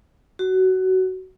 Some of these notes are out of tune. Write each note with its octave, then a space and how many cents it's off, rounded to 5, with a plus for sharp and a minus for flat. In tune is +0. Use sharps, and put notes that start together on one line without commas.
F#4 +20